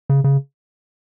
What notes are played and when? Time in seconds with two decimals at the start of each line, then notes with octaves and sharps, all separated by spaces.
0.09 C#3
0.24 C#3